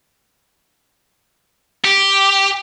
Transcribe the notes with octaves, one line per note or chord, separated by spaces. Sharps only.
G4